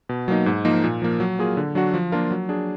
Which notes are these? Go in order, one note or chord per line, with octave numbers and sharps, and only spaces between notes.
B2
F#3 A#3 D#4
G#2
F3 A#3 D#4 A#4
A#2
F3 A#3
F#3
A#3 F4 G#4
D3
F#3 D4 F#4
F3
A#3 D4 F4 A#4
F#3
D4 G#4